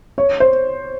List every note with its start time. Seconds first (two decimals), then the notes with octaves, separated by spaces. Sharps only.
0.18 C#5
0.40 C5